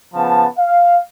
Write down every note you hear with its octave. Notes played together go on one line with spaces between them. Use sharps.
C#3 F3 B3 A5
F5